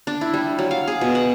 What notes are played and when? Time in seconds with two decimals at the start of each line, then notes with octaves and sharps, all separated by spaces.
0.07 D4
0.21 E4
0.34 G3
0.59 F#3
0.71 F5
0.88 G#4
1.01 B2
1.15 F#5